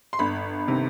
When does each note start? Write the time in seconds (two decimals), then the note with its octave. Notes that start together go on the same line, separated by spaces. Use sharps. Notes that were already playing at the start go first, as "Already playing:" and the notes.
0.13 C6
0.19 G1 B5
0.67 C3 D#3